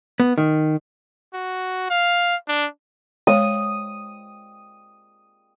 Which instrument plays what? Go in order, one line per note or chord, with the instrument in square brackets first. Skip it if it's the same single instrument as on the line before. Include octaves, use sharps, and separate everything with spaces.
[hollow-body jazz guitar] B3
D#3
[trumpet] F#4
F5
D4
[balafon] G#3 C#5 [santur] D#6